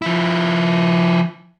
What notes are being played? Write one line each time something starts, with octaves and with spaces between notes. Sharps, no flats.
F3 E4